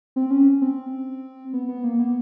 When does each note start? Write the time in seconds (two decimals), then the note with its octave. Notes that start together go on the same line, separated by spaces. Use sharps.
0.16 C4
0.31 C#4
0.62 C4
1.53 B3
1.69 B3
1.84 A#3
2.00 B3